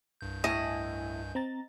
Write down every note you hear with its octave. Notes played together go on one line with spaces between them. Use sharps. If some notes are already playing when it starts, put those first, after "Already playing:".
C2 G2 G6
A2 E4 D#5 G#5
C4 A#5 A6